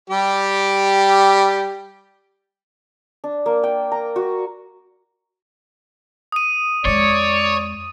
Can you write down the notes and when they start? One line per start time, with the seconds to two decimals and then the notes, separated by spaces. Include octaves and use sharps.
0.10 G3 G4
3.24 D4
3.46 A#3
3.63 G5
3.92 A#5
4.16 F#4
6.32 D#6 D#7
6.85 F2 G#3 C#5 D5